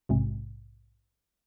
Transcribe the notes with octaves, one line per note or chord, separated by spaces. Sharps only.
A#1 G#2 C3